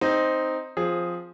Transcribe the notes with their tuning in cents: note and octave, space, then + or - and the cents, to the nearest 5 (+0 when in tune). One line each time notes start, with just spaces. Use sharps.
C4 +0 D#4 +0
F3 +5 C4 +0 G#4 +0